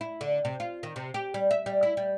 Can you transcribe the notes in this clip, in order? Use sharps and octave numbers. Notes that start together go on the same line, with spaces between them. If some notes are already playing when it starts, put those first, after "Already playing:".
E4
D3
C3
F4
D#3
C3
G4
G3
E5
G3
E4
G3